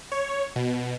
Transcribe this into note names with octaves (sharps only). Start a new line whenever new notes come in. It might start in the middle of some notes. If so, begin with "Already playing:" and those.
C#5
B2